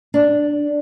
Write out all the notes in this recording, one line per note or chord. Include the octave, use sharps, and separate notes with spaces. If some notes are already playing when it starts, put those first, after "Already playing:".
D4